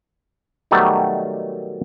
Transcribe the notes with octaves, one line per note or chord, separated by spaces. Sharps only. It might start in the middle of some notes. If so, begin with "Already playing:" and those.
B2 D#3 F#3 G3 A3 B3